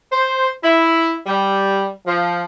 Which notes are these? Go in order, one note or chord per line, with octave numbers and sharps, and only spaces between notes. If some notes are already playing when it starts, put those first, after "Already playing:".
C5
E4
G3
F3